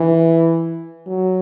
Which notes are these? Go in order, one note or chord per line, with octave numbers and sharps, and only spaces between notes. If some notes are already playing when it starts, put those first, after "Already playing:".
Already playing: E3
F#3